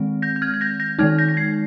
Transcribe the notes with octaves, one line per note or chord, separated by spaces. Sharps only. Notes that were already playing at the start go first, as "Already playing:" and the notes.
Already playing: D#3 G#3 C4
G6 A#6
G6
F6 G#6
G#6
G6 A#6
G6 A#6
D#3 G#3 D#4 F6 G#6
G6 A#6
A#6
G#6 C7